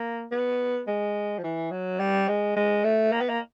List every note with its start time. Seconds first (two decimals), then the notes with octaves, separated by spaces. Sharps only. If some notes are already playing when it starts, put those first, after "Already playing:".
Already playing: A#3
0.32 B3
0.88 G#3
1.39 F3
1.44 E3
1.71 F#3
2.00 G3
2.28 G#3
2.56 G#3
2.84 A3
3.12 A#3
3.21 B3
3.29 A#3